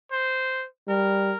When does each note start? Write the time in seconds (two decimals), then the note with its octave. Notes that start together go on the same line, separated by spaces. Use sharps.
0.12 C5
0.88 G3 A#4